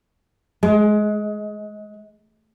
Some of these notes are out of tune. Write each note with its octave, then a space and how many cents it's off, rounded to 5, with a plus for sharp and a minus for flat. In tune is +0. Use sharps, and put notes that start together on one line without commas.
G#3 +20